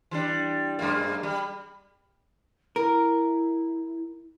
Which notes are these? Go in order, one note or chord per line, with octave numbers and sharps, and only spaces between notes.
E3 G3 D4
F#2 G#3 A#3
G3
E4 A#4